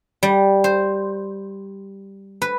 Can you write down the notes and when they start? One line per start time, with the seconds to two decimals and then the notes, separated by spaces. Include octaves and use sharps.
0.23 G3
0.64 C5
2.42 B4